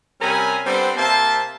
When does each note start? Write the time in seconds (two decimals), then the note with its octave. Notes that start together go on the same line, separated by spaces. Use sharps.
0.21 C3 G3 C#4 A#4 G#5 B5
0.66 G3 B3 C4 D4 A4 C5
0.97 C3 A#3 C4 C5 E5 A5